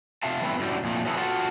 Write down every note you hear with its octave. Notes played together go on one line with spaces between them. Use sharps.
C3 F4 E5 F5 A5
E3 G3 A3 B3 C4 E4
F#2 A2 D3 G3
F2 A#2 A3
F3 F#3 B3 E4 G#4 A4
F4 F#4 A4